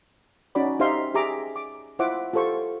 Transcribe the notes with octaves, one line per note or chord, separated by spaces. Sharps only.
C#4 D#4 F#4 D5 B5 D6
D#4 G4 C5 E5 F5 C6
G4 G#4 E5 A#5 D6
D6
E4 F4 C5 E5 F#5 D6
F4 G4 A4 C5 C#6